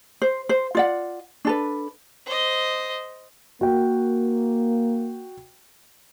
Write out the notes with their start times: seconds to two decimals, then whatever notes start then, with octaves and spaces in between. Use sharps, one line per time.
0.22 C5
0.49 C5
0.75 F4 D5 F#5
1.45 D4 A4 B4
2.26 C5 D#5
3.61 A#3 F#4 G5